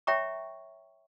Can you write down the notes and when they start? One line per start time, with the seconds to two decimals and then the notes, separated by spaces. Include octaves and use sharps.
0.07 C#5 E5 G5 A#5 C#6